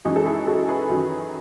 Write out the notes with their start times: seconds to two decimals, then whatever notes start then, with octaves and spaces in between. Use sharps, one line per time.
0.05 F#2 E3 G#3 D#4 F#4
0.16 A4
0.26 E4 G#4
0.47 F#4 A4
0.69 G#4 B4
0.89 F#2 D#3 F#3